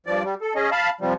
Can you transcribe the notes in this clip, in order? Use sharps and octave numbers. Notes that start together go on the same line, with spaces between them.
G2 F3 D5
G3
A4
C#4 G#4 D#5
F5 A5 B5
C3 F3 G3